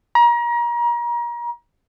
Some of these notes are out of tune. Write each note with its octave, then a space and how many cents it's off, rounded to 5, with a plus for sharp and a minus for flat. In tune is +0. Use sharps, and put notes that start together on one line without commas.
A#5 +30